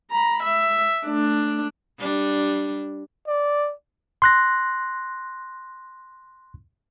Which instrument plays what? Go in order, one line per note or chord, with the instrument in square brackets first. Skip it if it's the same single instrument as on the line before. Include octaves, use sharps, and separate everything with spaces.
[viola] A#5 B5
E5
A3 D4
[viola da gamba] G3 D4
[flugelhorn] D5
[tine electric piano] C6 F#6 A#6